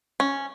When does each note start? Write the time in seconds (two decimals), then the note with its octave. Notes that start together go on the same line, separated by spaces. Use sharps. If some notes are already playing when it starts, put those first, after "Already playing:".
0.20 C#4